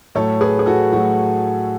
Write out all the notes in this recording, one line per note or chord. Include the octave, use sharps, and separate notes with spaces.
A2 F#3 A3 A4 C#5
G#4 B4
G#4
F#4 A4
A2 F#3 A3 F#4